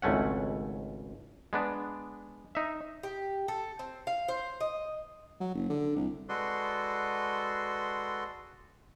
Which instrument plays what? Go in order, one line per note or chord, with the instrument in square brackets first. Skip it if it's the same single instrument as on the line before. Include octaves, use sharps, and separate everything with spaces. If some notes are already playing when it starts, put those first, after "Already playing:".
[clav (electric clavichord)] G#1 C#2 A3 C#4 F#5
G#3 B3 D4
D#4 E5
[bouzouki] G4
A4
C4
F5
C5
D#5
[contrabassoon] F#3
F#1
D3
C2
[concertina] G#3 F#4 A4 B4 D5 C6